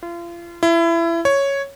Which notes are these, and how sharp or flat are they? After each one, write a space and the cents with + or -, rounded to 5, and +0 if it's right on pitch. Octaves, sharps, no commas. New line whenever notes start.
F4 -35
E4 +25
C#5 +0